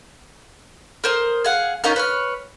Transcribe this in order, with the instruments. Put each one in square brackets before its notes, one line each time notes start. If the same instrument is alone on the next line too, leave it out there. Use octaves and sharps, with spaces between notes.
[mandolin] A#4 C5 D#6
G#4 F5 F#5
C#4 D#4 F4 A#4
B4 C#5 F6